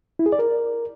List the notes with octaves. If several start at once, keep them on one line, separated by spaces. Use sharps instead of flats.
E4
G#4
D5
A#4